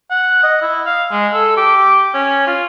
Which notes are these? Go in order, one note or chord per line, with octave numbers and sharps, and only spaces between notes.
F#5
D#5
E4
F5
G#3
A4
G4
C#4
F4